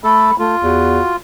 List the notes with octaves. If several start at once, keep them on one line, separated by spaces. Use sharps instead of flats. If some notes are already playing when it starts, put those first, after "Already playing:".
A3 A4 B5
A3 F4
E2 F#4